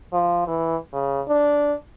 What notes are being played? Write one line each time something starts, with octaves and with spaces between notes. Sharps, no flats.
F3
E3
C#3
D4